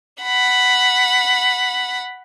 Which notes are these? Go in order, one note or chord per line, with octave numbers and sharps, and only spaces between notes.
F#5 B5